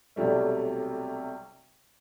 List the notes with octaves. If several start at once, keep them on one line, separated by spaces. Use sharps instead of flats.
B1 C3 F#3 G3 A3